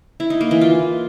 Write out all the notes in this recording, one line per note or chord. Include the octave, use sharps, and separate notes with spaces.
E4
D#4
A#3
E3
F4